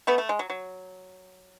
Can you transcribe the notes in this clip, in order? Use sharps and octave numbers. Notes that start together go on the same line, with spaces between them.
A3 B3
A3
G#3
F#3
F#3